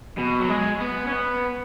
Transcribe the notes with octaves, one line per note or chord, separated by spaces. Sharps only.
B2
F#3
G#3
B3
C#4
B3